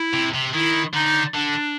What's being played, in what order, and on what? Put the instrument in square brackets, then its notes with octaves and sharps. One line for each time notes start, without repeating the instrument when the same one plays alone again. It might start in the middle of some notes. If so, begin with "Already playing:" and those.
Already playing: [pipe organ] E4
[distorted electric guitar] C3
C3
[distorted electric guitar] D#3 [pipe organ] E4
[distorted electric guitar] D3 [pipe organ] D#4
[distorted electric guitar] D3 [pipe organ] D4